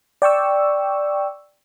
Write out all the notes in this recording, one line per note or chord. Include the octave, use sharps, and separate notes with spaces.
D5 G5 C#6 E6